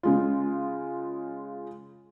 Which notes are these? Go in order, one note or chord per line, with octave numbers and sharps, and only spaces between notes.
C#3 G#3 F4